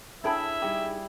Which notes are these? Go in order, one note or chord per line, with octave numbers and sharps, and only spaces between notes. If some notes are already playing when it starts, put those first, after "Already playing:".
D4 E4 G#4 A4 C#5 E5 G5 B5
G3 D#4 G#4